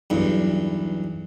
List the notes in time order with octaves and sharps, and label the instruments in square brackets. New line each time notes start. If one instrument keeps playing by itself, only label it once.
[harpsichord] B1 E2 G2